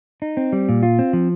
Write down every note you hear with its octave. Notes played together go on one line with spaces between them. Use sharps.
D#4
C4
G3
A#2
F4
C4
F3